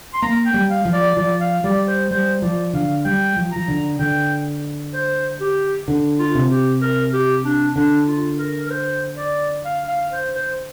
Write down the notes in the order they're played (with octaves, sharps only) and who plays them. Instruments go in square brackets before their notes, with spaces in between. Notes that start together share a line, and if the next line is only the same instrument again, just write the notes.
[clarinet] C6
[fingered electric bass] A#3 [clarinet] A#5
[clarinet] G5
[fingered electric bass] G3
[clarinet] F5
[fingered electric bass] F3
[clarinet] D5
[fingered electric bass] F3 [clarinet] D5
[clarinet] F5
[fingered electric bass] G3 [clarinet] D5
[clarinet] C5
[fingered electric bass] G3 [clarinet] C5
[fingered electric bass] F3 [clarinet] D5
[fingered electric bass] D3 [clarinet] F5
[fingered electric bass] G3 [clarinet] G5
[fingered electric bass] F3
[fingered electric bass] F3 [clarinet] A#5
[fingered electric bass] D3
[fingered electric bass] D3 [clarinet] G5
[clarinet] C5
G4
[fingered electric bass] D3
[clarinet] F4
[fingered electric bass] C3
[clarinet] G4
A#4
G4
D4
[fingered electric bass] D3 [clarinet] D4
[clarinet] F4
A#4
A#4
C5
D5
F5
F5
C5
C5